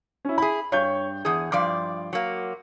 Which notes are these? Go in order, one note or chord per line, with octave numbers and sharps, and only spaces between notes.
C#4 E4
E4 G#4 B5
G2 C#5 C#6 G6
E2 G#4 D#6
G2 F3 D5 C6 D6
F#3 A#3